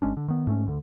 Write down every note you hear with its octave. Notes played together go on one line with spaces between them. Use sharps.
G#1 G#3 C#4 D4
D3
D#3 B3
G#2 A3 C4 C#4
D2 D3